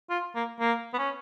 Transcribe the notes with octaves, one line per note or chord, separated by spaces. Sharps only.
F4
A#3
A#3
B3
C#4